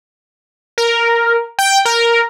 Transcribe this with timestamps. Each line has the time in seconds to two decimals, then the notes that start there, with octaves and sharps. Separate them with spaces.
0.78 A#4
1.59 G5
1.85 A#4